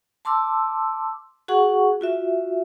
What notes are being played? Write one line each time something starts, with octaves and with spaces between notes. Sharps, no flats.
A5 C6 D6 E6
F#4 G#4 F#5 C#6
F4 F#4 E5